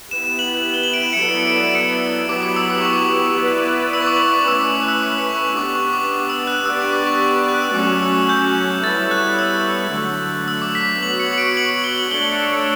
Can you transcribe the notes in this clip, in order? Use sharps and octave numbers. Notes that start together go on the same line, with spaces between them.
B3 E4 G4 B4 E7
F#7
G7
F#7
D7
E7
C#7
F#3 B3 E4 A4 D5 D7
D7
C#7
F#3 B3 E4 G4 D6
D6
E6
D6
C#6
D6
B3 E4 B4 D5
E6
C#6
D6
C#6
D6
A3 C#4 E4 B4 E6
D6
D6
F#6
E6
D6
C#6
B3 D4 G4 D6
C#6
D6
D6
E6
F#6
B3 D4 G4 B4 D5 E6
C#6
D6
C#6
F#6
E6
F#3 A3 C#4 F#4 D6
E6
G6
G3 B3 E4 A4 C#5 A6
F#6
E6
D3 F#3 A3
E6
D6
B6
B3 F#4 C#5 F#7
C#7
C#7
D7
F#7
G7
F#7
A3 D4 A4 C#5 G7